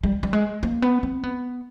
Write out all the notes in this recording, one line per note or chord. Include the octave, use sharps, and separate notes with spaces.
G3
G3
G#3
A#3
B3
C4
B3